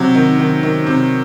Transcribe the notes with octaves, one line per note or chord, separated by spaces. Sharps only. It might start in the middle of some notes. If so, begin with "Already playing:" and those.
Already playing: C3 F#3
D#3
D#3
D#3
C3